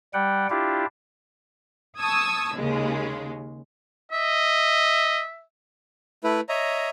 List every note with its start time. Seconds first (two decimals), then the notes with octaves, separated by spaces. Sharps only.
0.14 G3 F#5 G5
0.50 D4 E4 F4 G4
1.99 A5 C#6 D#6 E6 G#6
2.56 D#2 C#3 G#3
4.12 D#5 E5
6.24 A3 E4 B4
6.49 C#5 D#5 E5 A#5